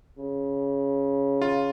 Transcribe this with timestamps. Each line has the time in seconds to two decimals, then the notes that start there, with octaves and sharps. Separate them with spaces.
0.19 C#3
1.42 F4